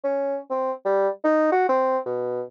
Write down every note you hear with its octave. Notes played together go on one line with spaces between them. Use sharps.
C#4
C4
G3
D#4
F#4
C4
B2